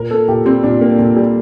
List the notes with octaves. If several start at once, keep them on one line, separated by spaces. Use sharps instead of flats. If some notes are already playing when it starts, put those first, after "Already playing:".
Already playing: A#2 A#4
A#3 A4
A#2 G4
G3 C4
A#2 D4
A#3
A#2
G3